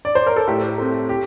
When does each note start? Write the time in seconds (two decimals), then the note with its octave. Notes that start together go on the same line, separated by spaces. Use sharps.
0.05 D5
0.15 C5
0.26 A#4
0.36 A4
0.48 A2 G4
0.78 A3 C4
1.09 G4